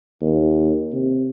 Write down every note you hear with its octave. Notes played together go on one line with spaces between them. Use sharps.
D#2
C3